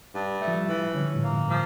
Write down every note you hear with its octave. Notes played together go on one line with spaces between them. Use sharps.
G2
A3
F3
G3
E3
D3 C#4
A2
A#3
G2
F3